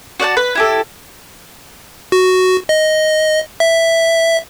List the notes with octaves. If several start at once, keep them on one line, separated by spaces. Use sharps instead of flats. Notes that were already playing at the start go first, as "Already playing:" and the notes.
F#4 D5 F#5 A5
B4
E4 G4 A4
F#4
D#5
E5